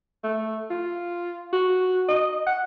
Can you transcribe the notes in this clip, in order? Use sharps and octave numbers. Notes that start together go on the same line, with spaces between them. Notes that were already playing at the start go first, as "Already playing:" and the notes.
A3
F4
F#4
D#5
F#5